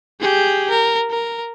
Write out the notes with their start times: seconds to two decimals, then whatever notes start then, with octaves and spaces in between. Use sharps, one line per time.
0.21 G4 G#4
0.70 A#4
1.10 A#4